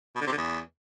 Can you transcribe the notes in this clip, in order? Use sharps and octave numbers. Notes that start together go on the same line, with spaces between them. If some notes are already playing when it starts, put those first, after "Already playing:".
B2
D3
C3
D3
E2